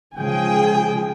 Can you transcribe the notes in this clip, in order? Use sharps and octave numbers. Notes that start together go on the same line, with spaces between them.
C#3 F3 G#3 G#4 G5 G#5